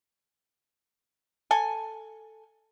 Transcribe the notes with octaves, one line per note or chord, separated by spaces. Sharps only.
A4 G#5